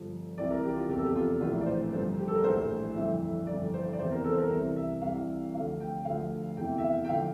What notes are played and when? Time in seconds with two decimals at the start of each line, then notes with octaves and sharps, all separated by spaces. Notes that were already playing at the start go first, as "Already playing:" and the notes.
Already playing: G1 G2 F3
0.38 C2 C3 E3 D5
0.50 A#4
0.64 G4
0.76 F4
0.89 F1 E2 C3 G4
0.98 A4
1.06 G4
1.16 F4
1.41 A#1 A2 E3 F4
1.61 D5
1.66 C5
1.93 G1 G2 F3 C5
2.19 G4
2.28 A4
2.35 A#4
2.43 A#1 A2 E3 C5
2.96 G1 F2 E3 E5
3.47 G1 F2 E3 D5
3.74 C5
3.93 D5
3.98 E2 C3 E3 C5
4.11 A#4
4.24 A4
4.32 C5
4.38 A#4
4.50 C2 C3 E3
4.76 E5
5.02 C2 C3 E3 F5
5.55 D2 D3 F3 F5
5.80 G5
6.05 D2 D3 F3 F5
6.57 E2 C3 E3 G5
6.78 E5
6.83 F5
7.05 G5
7.09 D3 F3 F5